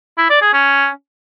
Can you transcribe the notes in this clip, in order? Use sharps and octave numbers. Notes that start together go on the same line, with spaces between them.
E4
D5
G#4
C#4